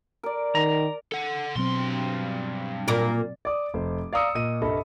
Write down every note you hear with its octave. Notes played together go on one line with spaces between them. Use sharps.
A#4 D5
D#3 A#5
A4 F#5
G2 B2 F#3 C4 C6
A#2 A#3 A#4 D5
D5 D6 D#6
F1 C5
D5 F5 A#5 D#6 E6 C#7
A#2 A#4 D#5 D#7
C2 G2 A4 D#5 B5